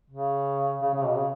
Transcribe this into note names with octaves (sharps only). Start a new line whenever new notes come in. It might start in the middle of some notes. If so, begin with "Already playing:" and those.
C#3
C#3
C#3
B2
C#3